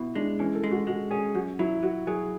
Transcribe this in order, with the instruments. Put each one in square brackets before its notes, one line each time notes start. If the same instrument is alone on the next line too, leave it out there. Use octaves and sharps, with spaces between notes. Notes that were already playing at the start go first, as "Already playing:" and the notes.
Already playing: [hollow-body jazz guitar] B2 [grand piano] E4
[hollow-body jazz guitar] G#3 [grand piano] D4
[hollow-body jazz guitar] E3 [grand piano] C#4
[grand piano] A4
[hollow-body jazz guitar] G#3
[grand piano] F#4
[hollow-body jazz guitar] G#3 [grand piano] F#4
[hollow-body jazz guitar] C#4 [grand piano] G#4
[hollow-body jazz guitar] F#2 [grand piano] F#4
[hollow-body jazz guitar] F#3 [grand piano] E4
[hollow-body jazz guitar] F#3 [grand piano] F#4
[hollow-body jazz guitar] F#3 [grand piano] G#4